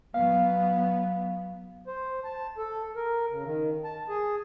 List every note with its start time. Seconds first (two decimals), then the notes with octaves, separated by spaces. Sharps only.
0.14 F#3 B3 F5
1.87 C5
2.24 A5
2.58 A4
2.96 A#4
3.31 C#3
3.45 D#3
3.84 A5
4.09 G#4